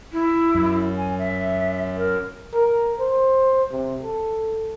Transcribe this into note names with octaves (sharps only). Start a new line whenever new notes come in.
E4
F#2
G#5
E5
A#4
A#4
C5
C3
A4